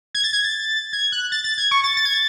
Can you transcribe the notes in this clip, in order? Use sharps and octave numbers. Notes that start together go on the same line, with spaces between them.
G#6
A6
G#6
A6
G#6
F#6
A6
A6
G#6
C#6
A6
A6
G#6
A6